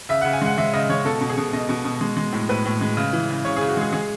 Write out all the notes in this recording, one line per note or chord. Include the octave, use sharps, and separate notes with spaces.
C#3 E5
F#5
C#3
G#5
G#3 F#5
G#3 E5
C#3 D#5
G#3 C#5
B2 A4
B2
G#4
B2
B2 D#5
B2
B2
G#3
G#3
A2
A2 B4
A2
G#3
C#3
E3
C#3
C#3 C#5
G#4
C#3
F#4
G#3 G#4
G#3 G#4